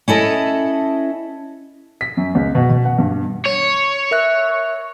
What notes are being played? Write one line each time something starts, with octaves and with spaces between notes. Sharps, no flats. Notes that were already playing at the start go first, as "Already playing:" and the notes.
C#4 E4 A4 D#5
B6
F#2
C#2
B2
B2
F#5
G2
C#5
A#4 E5 F#6